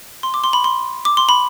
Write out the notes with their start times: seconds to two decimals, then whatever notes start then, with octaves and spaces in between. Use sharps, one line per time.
0.23 C6
0.34 D6
0.44 C6
0.53 B5
0.64 C6
1.05 D6
1.17 C6
1.29 B5